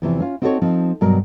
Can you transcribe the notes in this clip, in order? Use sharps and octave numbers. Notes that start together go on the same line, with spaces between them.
E2 C3 E3 F3
C#4 F4
C4 D#4 F#4 A4 C5 C#5
F3 C4 D#4
G2 B2 F#3 A#4